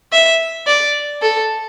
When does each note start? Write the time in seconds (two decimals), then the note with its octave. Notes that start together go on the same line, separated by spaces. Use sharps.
0.12 E5
0.67 D5
1.22 A4